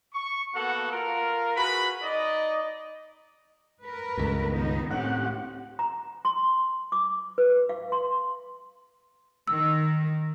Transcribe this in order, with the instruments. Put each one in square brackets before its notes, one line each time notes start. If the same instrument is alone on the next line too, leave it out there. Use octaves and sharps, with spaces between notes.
[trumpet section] C#6
A#3 B3 F#4 A4 F#5
F4 A#4
F#4 G#4 B4 B5
D#4 D5 D#5
[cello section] A#4 B4
[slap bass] C#2 G2
[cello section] D#3 B3 D#4
[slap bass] A2 [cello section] C4 C#4 G4 [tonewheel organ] F#5
[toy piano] A#5
C6
D6
B4
F5
C6
[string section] D#3 [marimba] E6